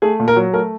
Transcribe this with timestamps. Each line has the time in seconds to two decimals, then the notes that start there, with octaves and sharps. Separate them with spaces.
0.02 A3 G#4
0.20 A#2
0.28 A#4
0.36 F#3
0.53 A3 A#4